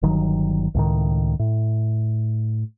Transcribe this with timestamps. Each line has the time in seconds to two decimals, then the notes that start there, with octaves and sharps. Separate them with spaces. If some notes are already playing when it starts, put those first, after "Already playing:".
0.03 G1 D#3 F#3
0.74 C#2 A2 D#3
1.39 A2